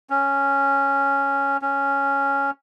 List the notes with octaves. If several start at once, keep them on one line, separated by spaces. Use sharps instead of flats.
C#4
C#4